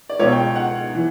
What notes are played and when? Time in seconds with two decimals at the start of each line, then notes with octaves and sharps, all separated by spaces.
0.09 D5
0.19 C#2 B2 C#5
0.32 G5
0.56 F#5
0.95 E3